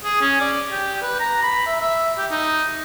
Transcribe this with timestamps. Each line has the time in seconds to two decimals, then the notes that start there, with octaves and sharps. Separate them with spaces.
0.04 G#4
0.21 C#4
0.41 D5
0.71 G4
1.02 B4
1.19 A#5
1.43 B5
1.66 E5
1.81 E5
2.18 G4
2.30 D#4